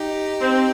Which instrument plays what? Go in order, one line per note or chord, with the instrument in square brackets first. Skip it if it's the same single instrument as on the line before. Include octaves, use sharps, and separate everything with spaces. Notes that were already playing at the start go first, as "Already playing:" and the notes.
Already playing: [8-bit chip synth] D#4 G4
[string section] C4